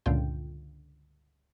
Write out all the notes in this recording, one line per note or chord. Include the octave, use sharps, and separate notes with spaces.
C#2 G2 A#2 D3 F4 G5